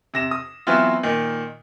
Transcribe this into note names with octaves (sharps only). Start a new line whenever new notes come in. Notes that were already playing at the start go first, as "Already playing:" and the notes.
C3 A#6 E7
D#6
E3 F#3 B3 C4 E4 F4
A#2 D#3